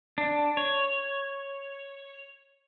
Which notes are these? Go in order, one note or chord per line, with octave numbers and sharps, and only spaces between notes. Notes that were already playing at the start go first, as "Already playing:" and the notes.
D4
C#5